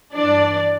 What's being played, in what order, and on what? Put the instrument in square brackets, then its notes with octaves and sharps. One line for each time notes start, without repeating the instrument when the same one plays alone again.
[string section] G2 E3 D4 D5